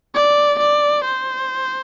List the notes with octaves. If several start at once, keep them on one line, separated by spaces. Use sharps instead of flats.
D5
D5
C5